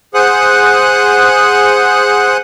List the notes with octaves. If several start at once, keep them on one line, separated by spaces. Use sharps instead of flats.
G#4 C5 F#5 D#6 F#6